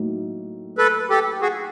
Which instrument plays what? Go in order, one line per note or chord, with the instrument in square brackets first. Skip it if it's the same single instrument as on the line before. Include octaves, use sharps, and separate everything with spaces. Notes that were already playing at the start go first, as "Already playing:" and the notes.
Already playing: [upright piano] A2 F#3 A#3 D#4
[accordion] A4 B4
G4 A4
F#4 G#4